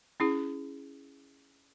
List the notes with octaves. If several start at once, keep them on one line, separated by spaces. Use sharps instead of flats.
C#4 E4 G#4